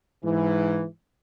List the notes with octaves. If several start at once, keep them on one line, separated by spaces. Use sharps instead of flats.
G#2 E3